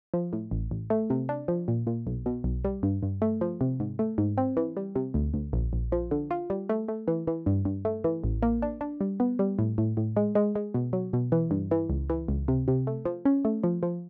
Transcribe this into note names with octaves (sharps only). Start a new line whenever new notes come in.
F3
A2
A1
A1
A3
C3
D4
F3
A#2
A#2
B1
B2
B1
G3
G2
G2
A3
F3
C3
G#2
A3
G#2
C4
E3
G3
C3
D2
D2
A#1
A#1
F3
D3
F4
G3
A3
A3
E3
E3
G2
G2
A3
E3
A1
A#3
D4
D4
G3
B3
G3
A2
A2
A2
G#3
G#3
G#3
B2
F#3
B2
E3
G2
E3
C#2
E3
C#2
C3
C3
A3
F3
C#4
A3
F3
F3